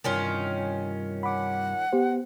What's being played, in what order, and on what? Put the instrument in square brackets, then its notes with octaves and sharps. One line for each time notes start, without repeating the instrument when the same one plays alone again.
[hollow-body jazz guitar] C2 G2 [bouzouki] D#3 C#4 F4
[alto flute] F#5 [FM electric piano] B5 D6
[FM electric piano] B3 G4 C5